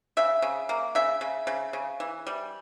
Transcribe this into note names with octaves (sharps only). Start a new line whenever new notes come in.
C#3 E5
C#3
A#3
C#3 E5
C#3
C#3
C#3
E3
G3